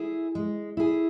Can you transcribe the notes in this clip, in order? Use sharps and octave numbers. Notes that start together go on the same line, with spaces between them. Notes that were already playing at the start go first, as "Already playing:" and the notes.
Already playing: E4 G#4
G#3
E4 G#4